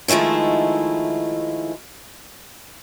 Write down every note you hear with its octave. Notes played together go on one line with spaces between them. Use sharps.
D#3 F3 G#3 A3 E4